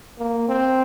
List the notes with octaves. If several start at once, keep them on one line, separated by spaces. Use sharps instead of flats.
A#3
C4